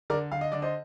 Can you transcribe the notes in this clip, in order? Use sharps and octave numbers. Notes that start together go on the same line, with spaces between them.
D3 A#4 D5
D3 F5
D#5
D3 D5
C5 D#5